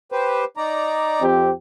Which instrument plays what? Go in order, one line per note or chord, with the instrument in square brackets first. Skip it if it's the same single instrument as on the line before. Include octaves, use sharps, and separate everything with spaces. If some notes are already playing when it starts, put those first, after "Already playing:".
[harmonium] G4 B4 C5
D#4 D5 A#5
[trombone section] F2 C4 G4